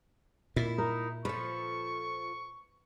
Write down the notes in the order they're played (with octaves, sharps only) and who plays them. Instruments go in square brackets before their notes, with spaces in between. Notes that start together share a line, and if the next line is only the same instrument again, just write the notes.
[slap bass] A#2 [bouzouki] E4
[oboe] D#4 [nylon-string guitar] A#4
[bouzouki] F3 A4 [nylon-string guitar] B4 [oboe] C#6